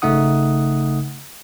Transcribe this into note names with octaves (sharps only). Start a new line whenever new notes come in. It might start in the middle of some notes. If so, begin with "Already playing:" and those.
G#1 C#3 A3 D#4 F#5 D#6